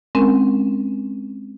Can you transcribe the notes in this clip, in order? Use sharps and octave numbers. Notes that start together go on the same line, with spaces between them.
G#3 C4 C#4 A#4